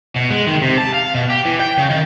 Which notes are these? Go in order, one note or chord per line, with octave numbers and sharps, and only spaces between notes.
B2
G#3
D#3
C3
A5
F5
B2
G4
E3
G5
C#3
D#3